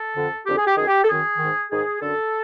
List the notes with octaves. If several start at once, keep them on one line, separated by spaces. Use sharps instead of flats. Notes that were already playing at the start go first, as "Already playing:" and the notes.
Already playing: A4
F2 D3
F2 D3 G4
G#4
G4
F#2 D#3 G#4
G4
A4
F#2 D#3 G#4
G#2 D#3
G#2 D#3 G#4
F#2 D3 A4